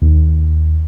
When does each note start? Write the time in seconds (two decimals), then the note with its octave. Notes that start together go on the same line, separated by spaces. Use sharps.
0.02 D#2